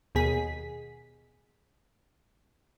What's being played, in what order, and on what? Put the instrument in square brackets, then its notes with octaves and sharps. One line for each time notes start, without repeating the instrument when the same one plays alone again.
[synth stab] D#2 B2 G#4 B6